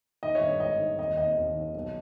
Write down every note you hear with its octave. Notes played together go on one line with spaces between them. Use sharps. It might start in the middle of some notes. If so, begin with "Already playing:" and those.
D#3 D#5
C#5 E5
G2
G#1 D#5
D#3
D#2 D#5
D#2 D#5
D#2
D#3
B1